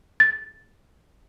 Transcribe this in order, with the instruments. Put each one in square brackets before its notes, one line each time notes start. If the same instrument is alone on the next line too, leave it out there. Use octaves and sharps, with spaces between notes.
[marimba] A6